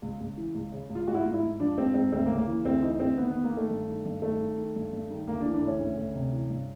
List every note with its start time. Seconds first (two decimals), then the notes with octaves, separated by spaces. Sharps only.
0.02 C#2
0.20 C#2
0.37 E3
0.55 C#2
0.72 C#3
0.90 C#2
0.95 F4
1.07 G#2 F#4
1.14 E4
1.21 G#2 F4
1.33 E4
1.42 G#2
1.60 F3 D4
1.78 G#2 C4
1.94 G#2 C4
2.12 D2 C4
2.26 A#3
2.29 C#3
2.38 A#3
2.47 E3
2.65 D2 C4
2.82 E3 D#4
3.00 D2 C4
3.17 D#3 B3
3.31 D#3 B3
3.44 A#3
3.52 D#3
3.57 A3
3.70 G2
3.87 D#3
4.05 G2
4.22 D#3 A3
4.40 D#3
4.57 D#3
4.75 G2
4.92 G2
5.10 D#3
5.27 D2 A#3
5.40 D4
5.45 E3
5.54 D4
5.62 D2
5.67 C#4
5.80 D2
5.97 D2
6.15 C3
6.32 E3
6.50 G2